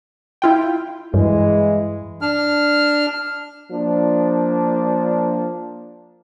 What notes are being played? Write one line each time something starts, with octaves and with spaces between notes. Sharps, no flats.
E4 F4 G5
G2 E3 G#3
D4 F6
F3 A#3 D4